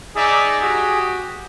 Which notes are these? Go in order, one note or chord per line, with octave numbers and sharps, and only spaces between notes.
D#4 G#4 D5 E5
F#4 G4